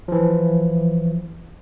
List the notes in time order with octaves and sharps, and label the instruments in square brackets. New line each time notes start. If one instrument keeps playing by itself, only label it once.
[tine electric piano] E3 F3